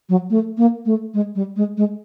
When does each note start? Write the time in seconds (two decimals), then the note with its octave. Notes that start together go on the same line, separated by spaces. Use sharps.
0.09 F#3
0.30 A3
0.58 A#3
0.86 A3
1.14 G#3
1.35 G3
1.56 G#3
1.77 G#3